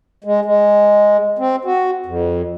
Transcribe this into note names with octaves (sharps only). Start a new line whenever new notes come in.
G#3
G#3
C4
F#4
F2